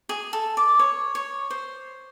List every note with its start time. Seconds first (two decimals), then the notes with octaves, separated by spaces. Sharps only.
0.09 G#4
0.33 A4
0.57 D5
0.79 C#5
1.15 C#5
1.50 C5